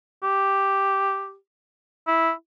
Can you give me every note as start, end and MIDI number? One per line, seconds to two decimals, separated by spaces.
0.23 1.35 67
2.08 2.32 64